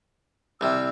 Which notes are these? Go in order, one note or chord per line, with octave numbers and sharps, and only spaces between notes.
C2 C3 E6